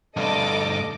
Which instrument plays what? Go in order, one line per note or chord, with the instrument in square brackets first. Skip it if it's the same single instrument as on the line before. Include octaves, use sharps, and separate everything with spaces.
[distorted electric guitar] D2 G2 [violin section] A4 D#5 D6